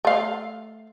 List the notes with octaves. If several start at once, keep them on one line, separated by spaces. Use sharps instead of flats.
A3 F5